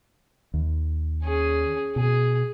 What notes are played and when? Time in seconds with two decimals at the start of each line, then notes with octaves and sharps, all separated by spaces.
0.54 D#2
1.23 C#4 G#4
1.96 B2 G#4